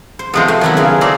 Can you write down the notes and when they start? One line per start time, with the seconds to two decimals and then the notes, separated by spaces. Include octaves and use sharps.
0.19 C5
0.33 C3 F3 G#3 B3 A4
0.48 F3 A3
0.61 D#3 F#3 B3 D#4 E4
0.77 C#3 F4 G#4
1.01 A3 C4 D5 A#5